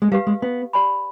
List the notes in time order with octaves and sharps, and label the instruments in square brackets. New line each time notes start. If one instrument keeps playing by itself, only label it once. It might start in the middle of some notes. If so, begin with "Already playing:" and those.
[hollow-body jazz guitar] G#3
[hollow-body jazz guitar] G3 [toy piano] G4 B4 F5
[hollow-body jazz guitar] G#3
B3
[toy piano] G4 D5 G#5 B5